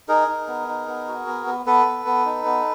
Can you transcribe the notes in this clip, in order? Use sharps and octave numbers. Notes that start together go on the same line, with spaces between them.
D#4 G#4 A#4
D#4
B3
D#4
B3
F#4
B3
B3
B3 A4 B4
B3
B3
D#4
B3